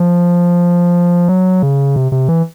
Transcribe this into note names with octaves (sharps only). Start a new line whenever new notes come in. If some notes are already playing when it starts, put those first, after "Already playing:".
Already playing: F3
F#3
C#3
C3
C3
E3